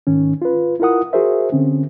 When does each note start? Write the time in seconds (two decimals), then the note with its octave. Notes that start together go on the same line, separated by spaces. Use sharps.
0.07 G#2 D#3 C#4
0.42 F4 B4
0.80 E4 F4 A#4 F#5 D#6
1.13 F#4 G#4 A#4 C5 E5
1.52 D3 C4 C#4